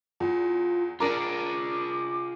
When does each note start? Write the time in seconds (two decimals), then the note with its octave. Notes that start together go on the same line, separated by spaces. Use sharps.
0.20 E2 F4
1.00 D4 F4 G#4 A#4 A#5 D6